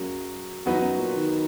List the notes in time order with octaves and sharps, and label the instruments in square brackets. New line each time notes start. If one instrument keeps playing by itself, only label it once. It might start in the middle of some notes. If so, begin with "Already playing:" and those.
Already playing: [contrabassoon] F#2 [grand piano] F#3 A#3 G#4
[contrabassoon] E2 [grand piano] F#3 B3 D#4 F#4 B4
[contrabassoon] E2
F#2
A#2
D#3